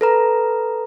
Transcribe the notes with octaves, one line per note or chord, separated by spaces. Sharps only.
A4 B4 A#5